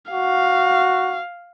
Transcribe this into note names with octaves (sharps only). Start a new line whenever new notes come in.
F#4 F5